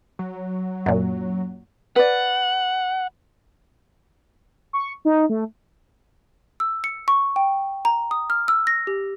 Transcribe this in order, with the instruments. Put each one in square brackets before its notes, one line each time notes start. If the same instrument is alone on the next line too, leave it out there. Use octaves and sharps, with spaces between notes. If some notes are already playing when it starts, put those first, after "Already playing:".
[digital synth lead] F#3
[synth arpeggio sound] F#2 A#2
[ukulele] B4 D5 [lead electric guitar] F#5
[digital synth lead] C#6
D#4
A3
[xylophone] E6
C#7
C#6
G5
A#5
D#6
F6
E6
A#6
G4